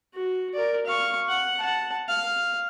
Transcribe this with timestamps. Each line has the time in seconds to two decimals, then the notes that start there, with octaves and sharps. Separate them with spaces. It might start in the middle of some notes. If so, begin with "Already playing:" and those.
0.14 F#4
0.54 A#4 D5
0.86 F5 C#6
1.29 F#5
1.59 F#5 A5
2.09 F5